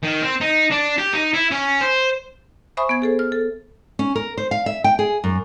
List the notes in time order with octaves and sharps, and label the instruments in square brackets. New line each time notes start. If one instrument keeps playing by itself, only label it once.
[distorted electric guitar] D#3
C4
D#4
D4
G4
D#4
E4
C#4
C5
[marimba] C5 E5 G#5 B5 C#6 D#6
B3 G#6
G#4 A4 C5
F6
A4
[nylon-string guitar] C#4
A#4
C5
F5
E5
G5
G#4
F#2